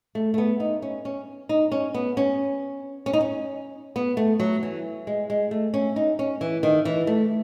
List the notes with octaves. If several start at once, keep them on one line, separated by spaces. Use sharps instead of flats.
A3
A3
B3
D#4
C#4
C#4
D#4
C#4
B3
C#4
C#4
D#4
C#4
B3
A3
F#3
E3
G#3
G#3
A3
C#4
D#4
C#4
E3
D#3
E3
A3